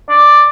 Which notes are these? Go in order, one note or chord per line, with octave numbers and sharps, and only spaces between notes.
D5